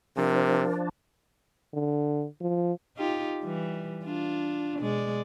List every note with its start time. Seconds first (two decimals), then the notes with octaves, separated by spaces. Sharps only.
0.17 C3 F3 D4 A#4
1.74 D3
2.41 F3
2.96 D#4 F4 G4
3.42 E3 G3
4.04 D4 F4
4.77 B2 G#3 D5